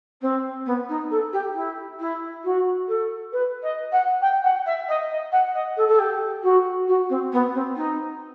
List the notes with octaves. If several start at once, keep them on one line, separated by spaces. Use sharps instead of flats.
C4
B3
D#4
A4
G4
E4
E4
F#4
A4
B4
D#5
F#5
G5
F#5
E5
D#5
D#5
F#5
D#5
A4
A4
G4
F#4
F#4
C4
B3
C4
D#4